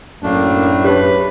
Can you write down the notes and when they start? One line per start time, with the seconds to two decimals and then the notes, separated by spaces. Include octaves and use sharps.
0.23 F#2 A2 A3 A#3 D4
0.85 G4 B4 C#5